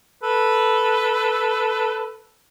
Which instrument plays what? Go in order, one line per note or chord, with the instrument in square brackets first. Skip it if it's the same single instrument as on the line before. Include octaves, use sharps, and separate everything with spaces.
[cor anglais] A4 [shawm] B4